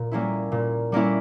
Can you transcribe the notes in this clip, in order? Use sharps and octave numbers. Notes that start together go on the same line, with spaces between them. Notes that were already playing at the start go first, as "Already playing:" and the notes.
Already playing: A#2
G3 A#3 C#4 E4
A#2
G3 A#3 C#4 E4